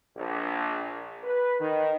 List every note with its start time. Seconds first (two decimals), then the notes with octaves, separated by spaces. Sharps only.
0.17 A#1
1.24 B4
1.60 D#3